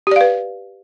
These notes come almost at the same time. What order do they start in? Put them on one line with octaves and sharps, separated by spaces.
G4 D5 F5 B4